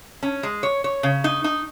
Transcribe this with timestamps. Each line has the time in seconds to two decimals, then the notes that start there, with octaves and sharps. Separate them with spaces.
0.23 C#4
0.43 G#3
0.63 C#5
0.84 C#5
1.03 C#3
1.24 D#4
1.44 D#4